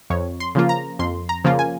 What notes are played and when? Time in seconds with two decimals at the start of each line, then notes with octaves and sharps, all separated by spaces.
0.10 F2 C#5
0.40 C6
0.55 C#3 F3 A#3 F4
0.69 A#5
0.99 F2 C6
1.29 A#5
1.45 C#3 F3 A#3 F4
1.59 G#5